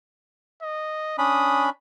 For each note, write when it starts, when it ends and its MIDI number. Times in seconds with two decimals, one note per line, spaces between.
0.62 1.14 75
1.18 1.70 61
1.18 1.70 62
1.18 1.70 83
1.18 1.68 87